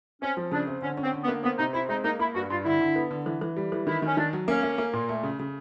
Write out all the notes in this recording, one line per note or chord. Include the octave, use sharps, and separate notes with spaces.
C4 C#4
F3
C#3 D4
C4
D3 C#4
C#4
C4
D3
B3
A#3
B3 C4
C3 D#4
C4 E4
G#3 D#4
A#3 D#4
A#3 E4
G2 F#4
G2 F4
D3 E4
D3
B3
D3
E3
E3
G3
E3
D#3 E4
D#3 C#4
D#3 D4
F#3
A#3 C#4
A#3
A#3
A#2
A3
C#3
C#3